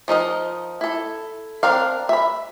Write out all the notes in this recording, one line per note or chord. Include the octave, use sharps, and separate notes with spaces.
F3 D#4 A#4 D#5
E4 A4
C4 D4 A#4 F5
E5 B5